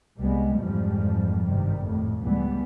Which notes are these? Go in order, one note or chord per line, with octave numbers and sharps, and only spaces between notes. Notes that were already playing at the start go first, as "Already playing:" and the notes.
C2 G3 G#3 B3
F2 G#2 E3 F3 G3
G#1 G2 C3 D#3 G3
F2 A2
C#2 E3 G3 B3